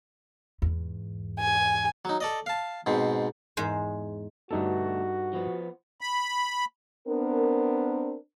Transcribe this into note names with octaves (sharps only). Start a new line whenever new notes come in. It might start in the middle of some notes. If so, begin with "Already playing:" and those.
E2 G#2
G#5
F#3 D#4
A4 D5 D#5
F5 A5
G#2 B2 C4
E2 G#2 G#3 C5
G2 B2 D3 A3 D#4 F#4 A4
F3 B3
B5
B3 C4 D4 A#4